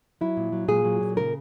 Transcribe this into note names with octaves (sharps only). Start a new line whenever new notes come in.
F#3 E4
A#2
F#3
A#2 G#4
F#3
A#2
C#3 A#4